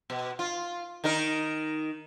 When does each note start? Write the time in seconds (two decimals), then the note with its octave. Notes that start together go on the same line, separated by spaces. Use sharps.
0.10 B2
0.39 F4
1.04 D#3 D#4 A#4